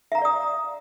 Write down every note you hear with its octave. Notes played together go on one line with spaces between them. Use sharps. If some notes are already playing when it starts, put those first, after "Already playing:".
D5 E5 F5 A#5 D#6